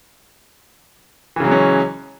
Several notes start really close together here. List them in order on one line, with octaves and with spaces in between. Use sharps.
E3 C#3 F#3 G#3 C#4